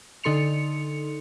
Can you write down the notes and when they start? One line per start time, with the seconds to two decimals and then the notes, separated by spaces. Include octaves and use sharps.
0.24 D3 D#4 A4 C6 C#7 F7